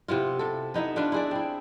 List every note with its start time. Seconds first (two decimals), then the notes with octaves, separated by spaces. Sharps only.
0.08 C3 B3 E4 F4
0.39 C3 A4
0.74 B3 D#4 E4 E5
0.96 D4 F4 B4
1.12 E4 G#4 D5
1.31 C4 E4